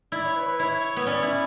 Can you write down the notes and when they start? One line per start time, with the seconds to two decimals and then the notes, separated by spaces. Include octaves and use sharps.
0.12 E4 D5
0.24 C#5
0.36 B4
0.48 B4
0.59 E4 C#5
0.96 B3
1.06 C#4 D5
1.23 E4